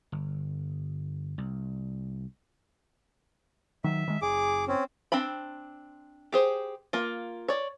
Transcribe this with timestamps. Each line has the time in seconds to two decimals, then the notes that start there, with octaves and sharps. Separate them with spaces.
0.12 G1
1.38 C2
3.84 D#3 F#3 E5
4.08 D#3 G#3
4.22 F#1 G#4 D6
4.68 C4 C#4
5.12 C4 D4 G5 B5
6.32 G4 G#4 C5
6.93 A#3 F4
7.48 C#5 D5